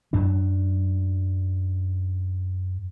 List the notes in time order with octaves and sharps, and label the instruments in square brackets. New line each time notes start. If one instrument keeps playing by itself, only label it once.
[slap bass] F#2 F#3 D4